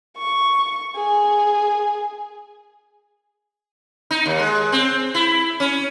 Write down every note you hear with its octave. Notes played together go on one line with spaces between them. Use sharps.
C#6
G#4
D#4
D#2
G#3
C4
E4
C#4